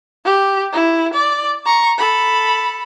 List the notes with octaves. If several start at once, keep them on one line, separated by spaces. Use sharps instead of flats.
G4
E4
D5
A#5 C#6
A4 B5